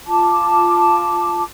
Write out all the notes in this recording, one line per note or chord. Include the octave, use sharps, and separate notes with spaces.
F4 A5 D6